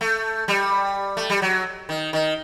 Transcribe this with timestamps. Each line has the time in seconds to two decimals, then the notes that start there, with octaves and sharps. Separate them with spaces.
0.01 A3
0.48 G3
1.17 A3
1.30 G3
1.42 F#3
1.89 D#3
2.13 D#3